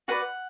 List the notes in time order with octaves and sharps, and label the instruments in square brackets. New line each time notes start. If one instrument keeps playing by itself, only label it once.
[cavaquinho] F#4 B4 D5 F#5